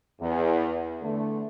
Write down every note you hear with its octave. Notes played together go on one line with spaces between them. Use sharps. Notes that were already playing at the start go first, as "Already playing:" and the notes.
E2
D3 A3